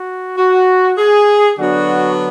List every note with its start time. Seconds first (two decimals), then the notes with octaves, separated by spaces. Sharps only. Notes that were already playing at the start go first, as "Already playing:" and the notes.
Already playing: F#4
0.38 F#4
0.98 G#4
1.58 D3 F#3 B3 D4 F#4